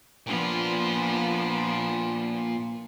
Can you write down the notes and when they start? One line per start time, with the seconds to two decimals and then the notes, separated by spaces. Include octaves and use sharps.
0.27 A#2 F3 B3 D4 F4